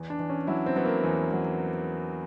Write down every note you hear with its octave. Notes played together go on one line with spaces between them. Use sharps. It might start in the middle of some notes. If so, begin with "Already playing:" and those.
Already playing: E2
D4
E2
C#4
F#3 E4
C4
F#3 B3
A#3
E2
F#3